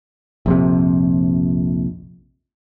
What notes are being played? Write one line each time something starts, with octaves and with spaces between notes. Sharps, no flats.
A#1 F2 C3